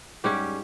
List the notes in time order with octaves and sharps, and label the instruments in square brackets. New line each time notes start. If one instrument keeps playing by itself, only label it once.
[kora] G#2 G3 C#4 G4